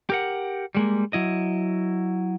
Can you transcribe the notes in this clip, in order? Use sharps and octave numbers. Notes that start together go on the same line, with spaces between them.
G4 A#4 F#5
G3 G#3 A#3
F#3 E4 D#5